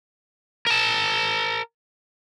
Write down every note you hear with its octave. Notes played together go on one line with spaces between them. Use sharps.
A#4 A5